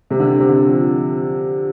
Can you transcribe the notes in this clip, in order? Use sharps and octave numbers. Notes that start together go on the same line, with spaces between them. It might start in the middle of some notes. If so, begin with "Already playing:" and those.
C3
D3
C3
D3
F3